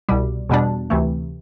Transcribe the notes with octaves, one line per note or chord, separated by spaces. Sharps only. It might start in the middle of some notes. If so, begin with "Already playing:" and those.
C2 B2 G3
E2 B2 G3 D4
D2 C3 E3 A3